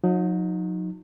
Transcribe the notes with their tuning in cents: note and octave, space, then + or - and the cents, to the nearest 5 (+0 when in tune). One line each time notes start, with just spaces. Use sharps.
F#3 -40 D#4 +0